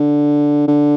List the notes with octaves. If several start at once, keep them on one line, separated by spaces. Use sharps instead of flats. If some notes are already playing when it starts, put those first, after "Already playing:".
Already playing: D3
D3